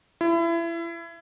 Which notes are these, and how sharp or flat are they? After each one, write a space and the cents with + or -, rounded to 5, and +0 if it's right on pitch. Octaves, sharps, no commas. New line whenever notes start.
E4 +30